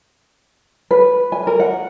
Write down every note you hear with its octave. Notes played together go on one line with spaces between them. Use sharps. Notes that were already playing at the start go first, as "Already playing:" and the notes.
B4
G#5
A#4
F#5